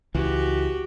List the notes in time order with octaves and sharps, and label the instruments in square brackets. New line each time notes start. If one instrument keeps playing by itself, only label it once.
[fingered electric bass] C#2 E3 [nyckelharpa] F#4 G4